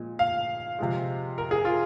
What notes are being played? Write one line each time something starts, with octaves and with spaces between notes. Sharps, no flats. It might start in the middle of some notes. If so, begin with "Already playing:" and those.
Already playing: A#2 F3 G#3
F5
C3 F3 G#3
A#4
G#4
F4